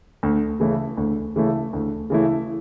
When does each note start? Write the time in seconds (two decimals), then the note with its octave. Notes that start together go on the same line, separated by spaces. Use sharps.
0.23 D2
0.60 C#3 E3 A3 E4
0.97 D2
1.36 C#3 E3 A3 E4
1.73 D2
2.10 C#3 E3 A3 E4